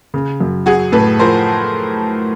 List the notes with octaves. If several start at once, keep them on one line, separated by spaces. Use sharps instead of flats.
C#3
F#2
F#3 F#4 G#4
A2 A4 B4
F3 A#4 C5